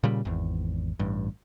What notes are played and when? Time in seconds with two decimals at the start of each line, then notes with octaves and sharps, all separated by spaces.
0.03 A#2 C#3 G3
0.25 G#1 E2
0.99 A1 G2